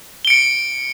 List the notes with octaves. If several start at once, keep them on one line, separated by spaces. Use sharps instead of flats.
C#7 D7 G7